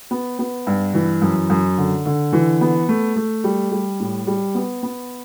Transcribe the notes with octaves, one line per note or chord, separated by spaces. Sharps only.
B3
B3
G2
E3
F#2
F#2
D3
D3
E3
B3
A3
A3
G3
G3
A2
G3
B3
B3